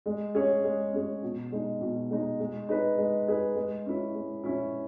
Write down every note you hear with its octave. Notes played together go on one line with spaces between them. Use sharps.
G#3
C#4 G#4 C#5
G#3
C#4 G#4 C#5
B2
G#3 D#4
B2
G#3 D#4
G#3
D#4 G#4 B4
G#3
D#4 G#4 B4
G#3
C#4 E4
G#3
C#4 E4